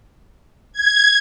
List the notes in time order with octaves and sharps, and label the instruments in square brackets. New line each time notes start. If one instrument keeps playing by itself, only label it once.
[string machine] G#6